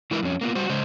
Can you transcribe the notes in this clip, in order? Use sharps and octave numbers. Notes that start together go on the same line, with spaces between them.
E3 G#3 E4 A#4 B4
F2 C#4
A#3 B3 F4
G3 F#4 C5
C#3 G#3 C5